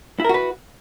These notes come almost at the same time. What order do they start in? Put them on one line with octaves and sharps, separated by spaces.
E4 A#4 F#4 B4